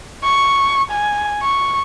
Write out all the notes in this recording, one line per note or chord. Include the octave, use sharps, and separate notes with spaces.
C#6
G#5
C#6